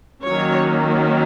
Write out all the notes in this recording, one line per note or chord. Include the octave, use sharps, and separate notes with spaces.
D#3 F#3 A#3 C#4 C#5